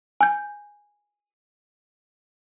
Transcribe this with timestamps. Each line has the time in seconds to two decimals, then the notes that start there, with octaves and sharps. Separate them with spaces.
0.21 G#5 G6